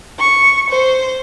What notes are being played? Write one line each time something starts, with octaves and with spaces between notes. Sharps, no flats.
C#6
C5